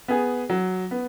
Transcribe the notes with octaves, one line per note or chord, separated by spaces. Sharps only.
B3 G#4
F#3
B3